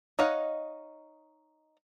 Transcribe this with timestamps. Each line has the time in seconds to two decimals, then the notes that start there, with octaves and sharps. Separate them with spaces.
0.19 D#4 C#5 D#5 F5 F#5